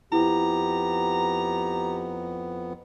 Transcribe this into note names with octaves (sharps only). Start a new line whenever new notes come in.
F2 B3 E4 G4 A#5